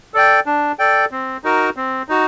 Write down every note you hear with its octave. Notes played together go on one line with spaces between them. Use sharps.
A4 D5 G5
D4
A4 D5 G5
C4
D#4 F#4 A#4
C4
D#4 F#4